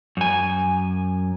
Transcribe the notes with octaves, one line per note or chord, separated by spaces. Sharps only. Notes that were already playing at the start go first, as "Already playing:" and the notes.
F#2 G#5